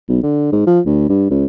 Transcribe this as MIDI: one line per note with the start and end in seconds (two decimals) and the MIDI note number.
0.09 0.21 35
0.23 0.52 50
0.52 0.66 44
0.67 0.80 53
0.86 1.05 38
1.09 1.29 43
1.30 1.46 37